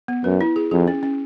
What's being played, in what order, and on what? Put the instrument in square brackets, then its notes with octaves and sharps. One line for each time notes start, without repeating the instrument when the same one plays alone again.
[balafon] B3
[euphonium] F#2 [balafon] B4
[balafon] E4
G#4
[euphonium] F2 [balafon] G#4
[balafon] C#4
C#4